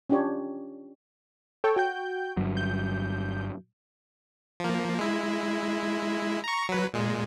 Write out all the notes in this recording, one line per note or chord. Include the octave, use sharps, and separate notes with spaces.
C#4 D4 F4 G4 C#5
A4 C#5 G5
F#4 G5 G6
G1 G2 F#3
G6
F3 A#3
G#3 E4
A#5 C#6
F#3 B4
A#2 G#3